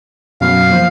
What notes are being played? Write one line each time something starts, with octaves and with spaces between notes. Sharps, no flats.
F#2 B2 F#3 F5
F3 A#3